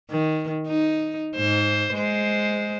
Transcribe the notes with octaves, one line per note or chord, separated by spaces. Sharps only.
D#3
D#4
G#2 C5
G#3 C5